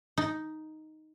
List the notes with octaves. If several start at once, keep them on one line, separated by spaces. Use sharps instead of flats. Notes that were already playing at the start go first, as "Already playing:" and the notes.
D#4